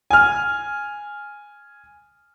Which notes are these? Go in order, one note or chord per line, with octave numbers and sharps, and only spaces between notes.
G#5 F6